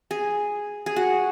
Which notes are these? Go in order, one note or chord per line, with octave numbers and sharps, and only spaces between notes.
G#4
G#4
F#4